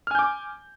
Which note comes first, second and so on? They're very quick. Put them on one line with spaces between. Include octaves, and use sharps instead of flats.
F6 G#5 G6 D6